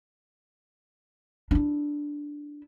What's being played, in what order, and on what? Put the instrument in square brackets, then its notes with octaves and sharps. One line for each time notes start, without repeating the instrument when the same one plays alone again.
[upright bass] D4 E4